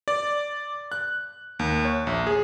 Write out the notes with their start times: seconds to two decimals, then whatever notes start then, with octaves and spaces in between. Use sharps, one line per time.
0.08 D5
0.92 F#6
1.59 D#2
1.85 C#5
2.07 A#1
2.27 G#4